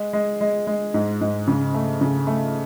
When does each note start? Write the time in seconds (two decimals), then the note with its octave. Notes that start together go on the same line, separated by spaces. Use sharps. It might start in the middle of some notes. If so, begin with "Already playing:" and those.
Already playing: G#3
0.13 G#3
0.41 G#3
0.67 G#3
0.94 G#2
1.21 G#2
1.48 C#3
1.74 A3
2.01 C#3
2.27 A3